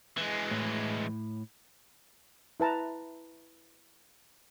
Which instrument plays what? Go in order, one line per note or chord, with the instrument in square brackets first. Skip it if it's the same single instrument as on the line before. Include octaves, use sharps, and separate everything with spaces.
[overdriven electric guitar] E3 G#3
[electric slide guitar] A2
[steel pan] E4 B4 A5 A#5